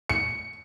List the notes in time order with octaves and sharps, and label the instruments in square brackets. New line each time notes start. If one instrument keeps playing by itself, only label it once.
[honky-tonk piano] C#7